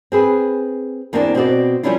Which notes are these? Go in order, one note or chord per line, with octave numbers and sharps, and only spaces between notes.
C4 G#4 B4
E2 A#3 C4 D4 A5
B2 C4 F#4 D5
F3 G3 C#4 D4 E4 F4